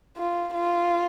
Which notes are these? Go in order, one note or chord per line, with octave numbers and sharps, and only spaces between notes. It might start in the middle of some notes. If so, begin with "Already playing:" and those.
F4
F4